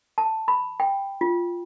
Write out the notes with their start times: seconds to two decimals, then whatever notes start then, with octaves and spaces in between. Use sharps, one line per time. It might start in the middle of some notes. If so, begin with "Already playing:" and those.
0.18 A5
0.48 B5
0.80 G5
1.21 F4